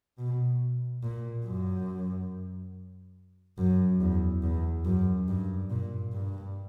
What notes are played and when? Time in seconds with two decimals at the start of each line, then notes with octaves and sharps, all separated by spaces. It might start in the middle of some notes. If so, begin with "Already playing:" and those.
0.18 B2
1.03 A#2
1.45 F#2
3.58 F#2
4.00 E2
4.42 E2
4.85 F#2
5.28 G2
5.70 A#2
6.13 G2